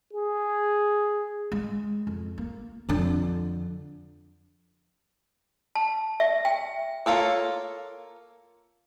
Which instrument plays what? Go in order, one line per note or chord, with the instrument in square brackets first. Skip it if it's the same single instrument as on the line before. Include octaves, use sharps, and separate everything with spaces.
[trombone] G#4
[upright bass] G#3
F2
A#3
F2 D3
[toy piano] A5
E5
G5
[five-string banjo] A#3 F4 A4 C#5